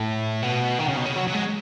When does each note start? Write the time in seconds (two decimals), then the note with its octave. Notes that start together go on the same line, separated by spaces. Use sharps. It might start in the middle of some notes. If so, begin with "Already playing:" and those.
Already playing: A2
0.42 B2
0.79 D#3
0.88 C#3
0.97 B2
1.06 C#3
1.16 F#3
1.27 F#3
1.34 G#3